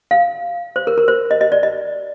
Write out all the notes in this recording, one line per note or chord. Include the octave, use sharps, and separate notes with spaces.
F5
C5
A#4
A#4
C5
D#5
D#5
D5
D#5